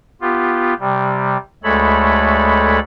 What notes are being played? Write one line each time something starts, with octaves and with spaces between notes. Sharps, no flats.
B3 F4 G4
C3 G3
D2 G#3 A3 A4 C#5 B5